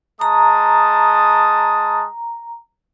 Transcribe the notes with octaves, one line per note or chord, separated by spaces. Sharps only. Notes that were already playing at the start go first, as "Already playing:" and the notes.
G#3 A5 A#5 D#6